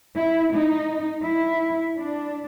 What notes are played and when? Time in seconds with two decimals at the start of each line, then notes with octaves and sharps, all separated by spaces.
0.16 E4
0.53 D#4
1.25 E4
1.98 D4